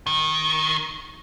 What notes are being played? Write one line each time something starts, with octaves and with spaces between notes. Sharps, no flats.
D#3